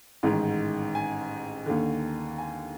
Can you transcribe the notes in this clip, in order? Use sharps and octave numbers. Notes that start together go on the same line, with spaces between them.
A1 G#2 D#3
G#5
D#2 D3
G#5